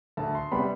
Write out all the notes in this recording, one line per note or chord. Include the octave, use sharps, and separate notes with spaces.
D2 A5
C6
C3 G3 B3 B5